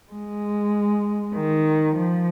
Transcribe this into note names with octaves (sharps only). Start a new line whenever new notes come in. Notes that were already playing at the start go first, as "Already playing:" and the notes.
G#3
D#3
F3